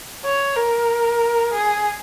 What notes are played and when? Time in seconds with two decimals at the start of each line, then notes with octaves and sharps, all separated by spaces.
0.25 C#5
0.57 A#4
1.53 G#4